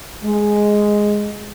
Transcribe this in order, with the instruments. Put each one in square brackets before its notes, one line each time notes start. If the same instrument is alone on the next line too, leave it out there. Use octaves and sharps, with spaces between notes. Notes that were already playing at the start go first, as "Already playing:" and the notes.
[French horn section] G#3